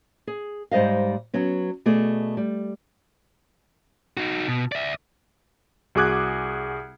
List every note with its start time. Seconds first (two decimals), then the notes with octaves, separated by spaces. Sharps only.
0.27 G#4
0.71 G#2 G3 C5 D#5 F5
1.34 F#3 B3 C#4
1.86 B2 A3 G#4 D5
2.37 G3
4.17 D#4 F#4
4.48 B2
4.72 D5 E5
5.95 C2 F#4 G#4 D6 F#6 G#6